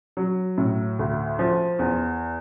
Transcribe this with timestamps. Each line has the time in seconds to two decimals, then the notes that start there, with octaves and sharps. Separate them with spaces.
0.17 F#3
0.58 A2
0.99 D2
1.39 F3
1.79 E2